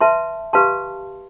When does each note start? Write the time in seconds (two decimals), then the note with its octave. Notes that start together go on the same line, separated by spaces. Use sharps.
0.01 B4 E5 A5 C6
0.53 G4 B4 F5 A5 C6